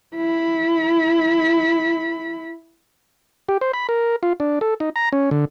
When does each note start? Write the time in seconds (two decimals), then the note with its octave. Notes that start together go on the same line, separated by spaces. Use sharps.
0.15 E4 B5
3.49 G4
3.61 C5
3.73 B5
3.89 A#4
4.23 F4
4.40 D4
4.61 A4
4.80 D#4
4.96 A#5
5.12 C#4
5.31 D3